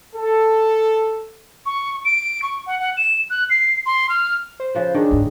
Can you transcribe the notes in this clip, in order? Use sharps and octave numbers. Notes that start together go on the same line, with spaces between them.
A4
C#6
D7
C#6
F#5
F#5
E7
F#6
C7
C6
F6
C5
C#3 F3 B4
D#3 D4 G#4
D2 G#2